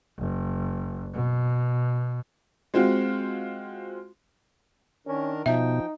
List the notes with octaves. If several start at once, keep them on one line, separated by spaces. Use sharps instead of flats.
F#1
B2
G#3 C4 F4 F#4
D#3 C#4 D4 A#4
B2 F3 D#4 E5 G5